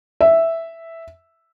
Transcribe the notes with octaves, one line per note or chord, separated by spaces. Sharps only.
E5